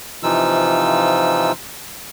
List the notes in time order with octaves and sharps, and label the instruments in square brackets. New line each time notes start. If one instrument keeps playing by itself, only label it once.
[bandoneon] C3 E3 F3 D#4 F4 E6